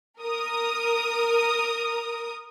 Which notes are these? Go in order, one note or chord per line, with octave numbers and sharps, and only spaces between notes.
A#4 D#6